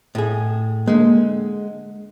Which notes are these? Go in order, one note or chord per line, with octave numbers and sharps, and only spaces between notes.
A2 G#4
D3 G#3 A#3